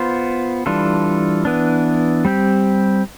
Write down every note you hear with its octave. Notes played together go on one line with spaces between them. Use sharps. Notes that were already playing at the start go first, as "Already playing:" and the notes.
Already playing: B3 F4 C5
E3 G3 D4 F4 A4
E3 B3 D4
G3 C4 G4